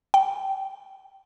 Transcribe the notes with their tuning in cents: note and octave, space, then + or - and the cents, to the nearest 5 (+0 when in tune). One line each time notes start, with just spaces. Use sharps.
G5 -25